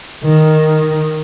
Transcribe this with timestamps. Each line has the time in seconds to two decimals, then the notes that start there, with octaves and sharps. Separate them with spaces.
0.24 D#3